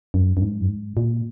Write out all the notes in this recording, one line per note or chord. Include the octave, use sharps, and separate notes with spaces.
F#2
F#2
G#2
F#2
G#2
A#2